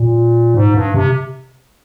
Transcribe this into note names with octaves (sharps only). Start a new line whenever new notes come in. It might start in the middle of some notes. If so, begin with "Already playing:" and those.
Already playing: A#2
G#2
G2
C3